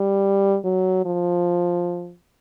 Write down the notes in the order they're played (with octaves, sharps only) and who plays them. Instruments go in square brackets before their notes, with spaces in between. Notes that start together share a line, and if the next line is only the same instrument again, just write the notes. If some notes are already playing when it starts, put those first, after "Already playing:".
Already playing: [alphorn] G3
F#3
F3